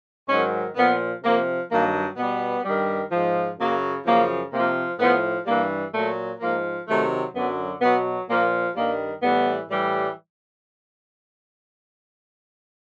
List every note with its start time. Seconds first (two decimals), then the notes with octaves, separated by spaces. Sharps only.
0.28 G#2 D#3 F#3 C#4
0.76 A#2 F3 B3
1.23 C3 F3 A#3
1.70 G2 D#3 F#3 A#3
2.17 B2 G3 B3
2.64 G2 D#3 G3
3.11 G#2 F3
3.58 F#2 C#3 F#3 A#3
4.05 F#2 C#3 F3 A#3
4.52 C3 F3 A#3
4.99 A2 F3 B3
5.46 G2 E3 G3 A#3
5.93 A#2 F#3 A3
6.40 G#2 F3 A#3
6.87 C3 D#3 F#3 A3
7.34 F#2 D3 F#3 B3
7.81 B2 F#3 B3
8.28 A#2 F3 A#3
8.75 G2 D#3 G3 A#3
9.22 A2 E3 G3 B3
9.69 A2 E3 G3